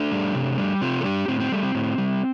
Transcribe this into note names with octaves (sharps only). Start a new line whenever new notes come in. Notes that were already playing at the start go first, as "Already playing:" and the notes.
Already playing: A3 D4
G3
C3
G3
C3 C4 F4
A4
G3 D4 G4
A2 C4
C4
G3 A3
C4
A2
G3